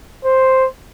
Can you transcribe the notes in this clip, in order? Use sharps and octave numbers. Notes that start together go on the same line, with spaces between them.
C5